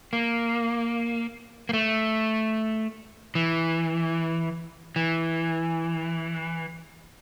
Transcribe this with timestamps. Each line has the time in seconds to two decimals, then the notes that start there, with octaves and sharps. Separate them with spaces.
0.13 A#3
1.69 A#3
1.73 A3
3.35 E3
4.96 E3